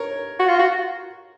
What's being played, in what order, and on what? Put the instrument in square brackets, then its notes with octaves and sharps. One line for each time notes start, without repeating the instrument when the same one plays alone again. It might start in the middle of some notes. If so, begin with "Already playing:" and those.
Already playing: [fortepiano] A#4 C#5
[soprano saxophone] F#4
F4
F#4